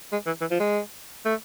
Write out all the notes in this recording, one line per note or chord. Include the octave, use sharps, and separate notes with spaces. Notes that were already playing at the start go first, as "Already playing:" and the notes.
G#3
E3
E3
F3
G#3
A3